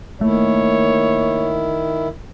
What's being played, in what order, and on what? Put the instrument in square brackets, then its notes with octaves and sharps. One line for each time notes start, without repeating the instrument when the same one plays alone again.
[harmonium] D#3 E4 [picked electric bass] A3 [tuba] A#3 [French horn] C#5